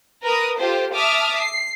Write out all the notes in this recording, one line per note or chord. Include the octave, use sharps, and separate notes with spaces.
A#4 B4 D#6
F4 G4 A4 C5
E5 A5 D6 D#6 F6
C7